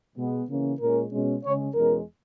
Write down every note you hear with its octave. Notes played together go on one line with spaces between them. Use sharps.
B2 G#3 B3
C#3 E3 A#3 C#4
A#2 G#3 C#4 A#4
B2 G#3 C#4
C#3 G#3 C#4 C#5
E2 B2 G#3 C#4 A#4